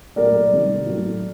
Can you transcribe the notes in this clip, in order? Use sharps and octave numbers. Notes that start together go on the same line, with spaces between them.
A#2 F#3 A3 A#4 D5
C3 D#3 G3
A2 F#3 A3